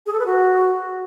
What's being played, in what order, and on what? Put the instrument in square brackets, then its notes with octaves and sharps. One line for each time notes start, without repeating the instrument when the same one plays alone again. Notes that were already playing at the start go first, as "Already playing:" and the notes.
[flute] G#4
A4
B4
F#4